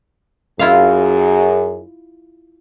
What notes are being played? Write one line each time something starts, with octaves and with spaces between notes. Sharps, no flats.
F#2 E4 F4 G#4 F5